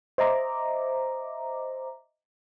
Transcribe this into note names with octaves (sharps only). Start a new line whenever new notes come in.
C5 D#5 E5 A#5 D6